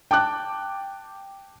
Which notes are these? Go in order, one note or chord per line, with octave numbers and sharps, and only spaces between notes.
G5 A5 D6 F#6